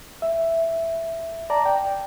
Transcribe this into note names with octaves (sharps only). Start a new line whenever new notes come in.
E5
D5 A5 A#5
G5